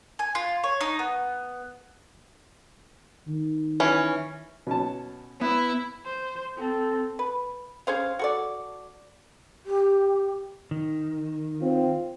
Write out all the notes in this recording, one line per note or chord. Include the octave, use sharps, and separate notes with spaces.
G#5
F4
C#5
D#4
B3
D#3
E3 C#4
B2 C#4 A5
B3 E4 E5
C5
C4 A4
B4
C#4 G#4 C5 F5
F#4 A4 D5
G4
D#3
C4 F4